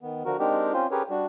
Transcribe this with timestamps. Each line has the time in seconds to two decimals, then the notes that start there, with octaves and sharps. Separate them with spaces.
0.01 D#3 B3
0.25 D3 F3 F#4 A#4
0.39 G#3 C4 D4 D#4 G4 A#4
0.73 C4 C#4 F4 C5
0.91 C#4 G4 G#4 A#4 B4 C#5
1.10 G3 D4 F#4